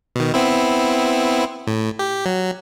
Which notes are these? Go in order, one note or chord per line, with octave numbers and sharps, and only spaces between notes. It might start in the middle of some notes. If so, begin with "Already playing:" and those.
B2 D#3
B3 C4 E4
A2
G4
F#3